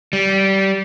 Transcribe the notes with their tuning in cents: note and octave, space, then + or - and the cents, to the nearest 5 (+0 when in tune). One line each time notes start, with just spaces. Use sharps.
G3 -20